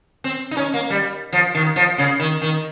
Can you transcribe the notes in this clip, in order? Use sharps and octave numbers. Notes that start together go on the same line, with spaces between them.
C4
D#4
C#4
A#3
G3
F3
D#3
F3
C#3
D#3
D#3